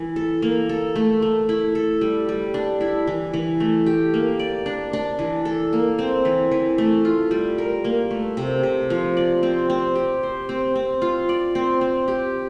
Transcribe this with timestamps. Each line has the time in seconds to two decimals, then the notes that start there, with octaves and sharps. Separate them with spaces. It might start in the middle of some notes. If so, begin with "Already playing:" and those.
Already playing: E3 E4
0.16 A4
0.42 A#3
0.69 A4
0.95 A3
1.22 A3
1.49 E4
1.75 A4
2.01 G3
2.29 G3
2.54 D4
2.81 E4
3.07 E3
3.34 E3
3.60 A3
3.86 G4
4.14 A#3
4.39 D5
4.66 D4
4.93 D4
5.19 E3
5.45 A4
5.73 A#3
5.99 C4
6.25 E3
6.51 E3
6.78 A3
7.05 F4
7.31 G3
7.58 A#4
7.84 A#3
8.11 A3
8.37 C3
8.63 C3
8.90 F3
9.17 D5
9.43 C4
9.70 C4
9.95 G4
10.23 C5
10.49 C4
10.76 C4
11.02 F4
11.29 D5
11.55 C4
11.81 C4
12.08 G4